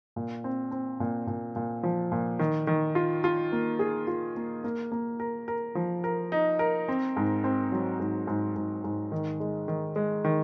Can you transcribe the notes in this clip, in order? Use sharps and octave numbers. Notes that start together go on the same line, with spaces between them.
A#2
C4
C4
A#2
A#2
A#2
F3
A#2
D#3
D#3
F4
F4
A#3
G#4
F4
A#3
A#3
A#3
A#4
A#4
F3
A#4
D#4
A#4
C4
G#2
C4
F#3
G#2
G#2
G#2
G#2
D#3
G#3
D#3
G#3
D#3